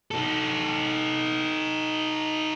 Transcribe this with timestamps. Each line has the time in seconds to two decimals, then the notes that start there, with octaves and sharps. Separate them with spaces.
0.11 D#4 A4